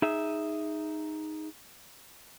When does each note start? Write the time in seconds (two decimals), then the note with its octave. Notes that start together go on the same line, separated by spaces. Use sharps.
0.02 D#4 G#4 E5